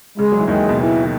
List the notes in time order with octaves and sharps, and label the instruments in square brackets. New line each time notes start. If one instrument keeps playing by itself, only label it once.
[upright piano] C#3 [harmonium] G#3
[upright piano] F#3
E3
[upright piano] D#2 D#3 [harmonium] G#3
[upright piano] B2
[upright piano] C#3 [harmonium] E3
[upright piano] D#3